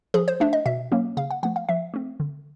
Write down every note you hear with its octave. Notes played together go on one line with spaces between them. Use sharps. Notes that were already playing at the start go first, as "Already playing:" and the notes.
F3 G#4
C5
A3 D4 E5
D#5
B2 E5
F#3 A#3 C#4
C#3 F5
F#5
F3 A3 F#5
F5
F3 E5
A3 C4
D3